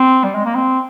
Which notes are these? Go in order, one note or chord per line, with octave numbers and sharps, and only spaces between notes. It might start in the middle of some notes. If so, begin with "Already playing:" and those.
Already playing: C4
G3
G#3
A#3
C4